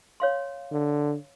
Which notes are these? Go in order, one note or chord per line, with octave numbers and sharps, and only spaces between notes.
C#5 F5 C6
D3